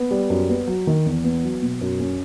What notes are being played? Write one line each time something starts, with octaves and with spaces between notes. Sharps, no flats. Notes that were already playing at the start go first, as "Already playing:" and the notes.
Already playing: B3
G3
F#2
B3
F#3
D#3
E2
B3
F#3
B2
F#2
C#4